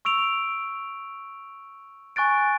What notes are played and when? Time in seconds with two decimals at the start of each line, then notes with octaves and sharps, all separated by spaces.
0.05 C#6 E6 D7 F7
2.16 G#5 C#6 F#6 A6 D7